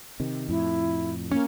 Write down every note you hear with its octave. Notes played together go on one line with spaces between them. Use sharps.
C3 D#3
F2 A2 E4
A#3 C#4